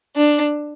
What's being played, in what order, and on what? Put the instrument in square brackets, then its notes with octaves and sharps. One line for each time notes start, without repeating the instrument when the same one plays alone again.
[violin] D4